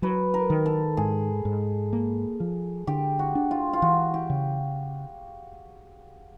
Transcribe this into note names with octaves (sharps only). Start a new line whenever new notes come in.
F#3 B4
A#4
D#3
A4
G#2 G#4
G#2
A#3
F3
D3 G4
F#4
D4
F4
F4
E3 F#4
G4
C#3